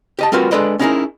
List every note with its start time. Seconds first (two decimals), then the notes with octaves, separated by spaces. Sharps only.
0.19 G4 D#5 A5
0.32 G3 C4 F4 F#4 A#4 B4
0.51 G#3 D4 A4 B4 D5 D#5
0.79 C#4 D#4 E4 G4 G#4 A#4